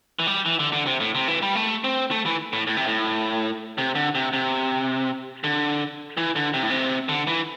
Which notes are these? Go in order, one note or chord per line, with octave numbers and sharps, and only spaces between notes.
E3
G3
E3
D3
D3
C3
A2
C3
E3
G3
A3
C4
A3
E3
A2
A2
C3
A2
C3
D3
C3
C3
D3
E3
D3
C3
A2
C3
D3
E3